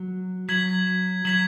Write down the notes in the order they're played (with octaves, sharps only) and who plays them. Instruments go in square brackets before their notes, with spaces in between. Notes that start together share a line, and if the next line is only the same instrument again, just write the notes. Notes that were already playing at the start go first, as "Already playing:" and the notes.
Already playing: [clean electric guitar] F#3
[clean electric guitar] F#3 [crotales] G#6 B6 F#7
[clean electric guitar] F#3 [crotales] G#6 B6 F#7